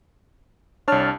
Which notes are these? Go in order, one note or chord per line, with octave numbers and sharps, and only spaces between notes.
C2 D4 C#5 A5 F6